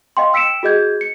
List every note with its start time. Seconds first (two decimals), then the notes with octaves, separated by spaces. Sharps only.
0.17 D#5 F5 G5 C6
0.33 G5 E6 B6 C#7 D7 E7
0.63 F#4 G#4 D#5 G6 G#6
1.01 C#7